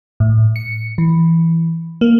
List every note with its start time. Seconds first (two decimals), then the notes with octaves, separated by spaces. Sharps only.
0.20 A2
0.56 C#7
0.98 E3
2.01 A#3